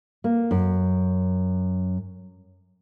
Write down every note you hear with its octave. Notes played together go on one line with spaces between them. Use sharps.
A#3
F#2